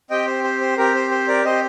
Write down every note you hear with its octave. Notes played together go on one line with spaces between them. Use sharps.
C4 G4 D#5 G5
C5
C5
C5
C4 G4 A#4
C5
C5
A#4 D5
C4 G4 C5 D#5